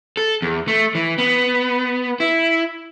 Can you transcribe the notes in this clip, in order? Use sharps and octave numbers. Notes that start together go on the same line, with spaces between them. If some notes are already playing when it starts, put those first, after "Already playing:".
A4
E2
A3
E3
B3
E4